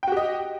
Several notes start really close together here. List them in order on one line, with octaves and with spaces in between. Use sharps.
G5 F#4 G4 D#5